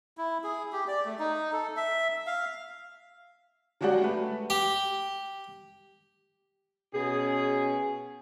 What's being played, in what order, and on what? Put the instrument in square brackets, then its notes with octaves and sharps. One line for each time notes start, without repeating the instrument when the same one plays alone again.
[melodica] E4
G#4
G4
D5
A3
D#4
A4
E5
F5
[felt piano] F#3 G#3 F#4 G4 D5 F#5
A3 B4
[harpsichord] G4
[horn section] B2 C#4 G#4